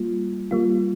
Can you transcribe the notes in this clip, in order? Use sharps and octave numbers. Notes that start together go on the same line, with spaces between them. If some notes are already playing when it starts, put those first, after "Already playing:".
Already playing: G3 A#3 F4
G3 A#3 F4